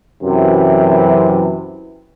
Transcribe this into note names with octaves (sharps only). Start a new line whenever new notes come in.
F#2 C3 E3